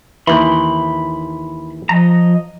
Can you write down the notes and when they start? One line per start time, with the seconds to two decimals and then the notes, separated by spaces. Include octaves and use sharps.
0.27 D#2 E3 B5 C6
1.89 F3 D#5 A#5